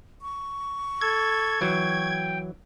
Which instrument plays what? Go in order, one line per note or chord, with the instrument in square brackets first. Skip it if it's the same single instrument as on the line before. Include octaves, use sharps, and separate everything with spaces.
[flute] C#6
[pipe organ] A4 [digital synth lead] G#6
[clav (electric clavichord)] E3 F#3 [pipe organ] G5